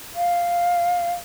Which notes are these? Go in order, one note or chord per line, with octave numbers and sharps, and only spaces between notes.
F5